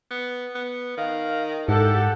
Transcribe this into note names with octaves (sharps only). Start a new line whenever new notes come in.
B3
B3
D#3 F5
G#2 E4 G4 A4 F#5